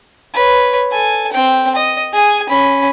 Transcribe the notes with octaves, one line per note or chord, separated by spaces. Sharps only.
B4 C#5
A4 G#5
C4 G5
D#5
G#4 G#5
C#4 B5